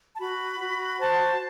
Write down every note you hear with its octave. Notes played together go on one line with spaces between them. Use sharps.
A5
F#4 B5
F#4
C5 A5